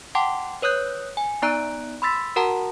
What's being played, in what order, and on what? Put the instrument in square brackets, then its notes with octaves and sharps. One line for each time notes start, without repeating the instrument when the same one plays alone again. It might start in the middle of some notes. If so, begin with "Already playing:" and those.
[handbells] F#5 G5 A5 C6 D6
B4 C#5 D#6 F#6 G6
G#5
B3 D#4 D5 A#5 F#6 D7
B5 C6 E6 A6 B6
F#4 A#4 F#5 A5 A#5 C6